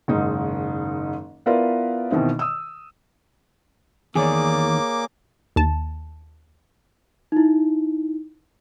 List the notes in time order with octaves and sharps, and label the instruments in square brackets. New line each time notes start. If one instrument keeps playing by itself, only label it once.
[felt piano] F#1 G#2 D#3 D#4
B3 E4 F4 A#4 B4 D5
B2 D#3 E3 C4
D#6 E6
[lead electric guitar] E2 D#3 [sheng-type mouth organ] A#3 D6 [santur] G#4 C#5 D5
[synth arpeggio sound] D#2 A5
[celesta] D#4 E4